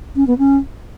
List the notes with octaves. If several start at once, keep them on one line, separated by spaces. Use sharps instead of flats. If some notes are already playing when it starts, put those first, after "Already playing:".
C#4
B3
C#4